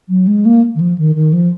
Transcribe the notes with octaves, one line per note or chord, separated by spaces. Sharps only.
F#3
G#3
A#3
D#3
F3
D#3
D#3
F3